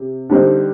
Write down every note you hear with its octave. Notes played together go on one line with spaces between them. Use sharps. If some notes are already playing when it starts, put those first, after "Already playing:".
Already playing: C3
D3 G3 C4 D#4